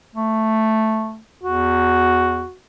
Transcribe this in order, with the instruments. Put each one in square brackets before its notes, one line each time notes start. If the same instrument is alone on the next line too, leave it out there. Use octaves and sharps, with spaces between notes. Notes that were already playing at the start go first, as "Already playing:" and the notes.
[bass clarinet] A3
[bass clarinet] E2 [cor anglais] F#4